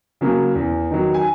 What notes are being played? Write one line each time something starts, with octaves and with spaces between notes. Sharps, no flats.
C#3 F#3 A#3
E2
D#3 F#3
G#5